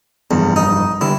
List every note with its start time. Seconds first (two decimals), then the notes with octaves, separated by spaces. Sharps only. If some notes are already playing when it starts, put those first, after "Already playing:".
0.31 F1 A#1 E2 G2
0.56 D#4
1.01 D3 G3 E4